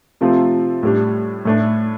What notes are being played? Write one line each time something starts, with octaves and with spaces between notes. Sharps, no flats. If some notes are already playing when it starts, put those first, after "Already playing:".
C3 F3 A3 C4 F4
A2 G3 D4
A2 A3 D4